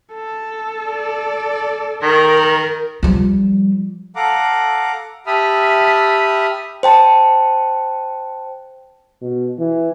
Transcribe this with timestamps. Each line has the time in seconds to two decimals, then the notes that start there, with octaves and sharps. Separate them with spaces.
0.14 A4
0.88 D5
2.03 D#3 A#4
3.03 F3 G3
4.16 A4 F5 F#5 A#5 D6
5.26 G4 E5 A5 B5 D#6 F6
6.83 C5 G5 A5
9.22 B2
9.59 E3